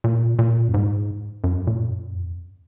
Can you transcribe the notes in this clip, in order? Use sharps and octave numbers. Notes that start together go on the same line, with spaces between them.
A#2
A#2
F#2
G#2
F#2
A#2
F#2
F2